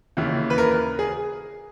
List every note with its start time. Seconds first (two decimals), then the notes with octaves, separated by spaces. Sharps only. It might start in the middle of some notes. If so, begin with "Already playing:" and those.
0.17 D#2 C#3 E3
0.50 B4
0.58 A#4
0.99 G#4